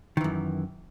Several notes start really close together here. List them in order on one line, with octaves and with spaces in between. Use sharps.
D#3 E3 F#2